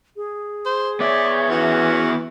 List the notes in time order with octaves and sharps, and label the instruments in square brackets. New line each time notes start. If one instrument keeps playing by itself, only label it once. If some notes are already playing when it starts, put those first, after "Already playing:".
[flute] G#4
[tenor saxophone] C5
[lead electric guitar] B3 E5 [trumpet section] C#5 [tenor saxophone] D5
[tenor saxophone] E3 [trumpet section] C#4 F#4